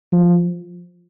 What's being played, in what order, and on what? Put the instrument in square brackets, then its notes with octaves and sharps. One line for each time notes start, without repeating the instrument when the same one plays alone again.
[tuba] F3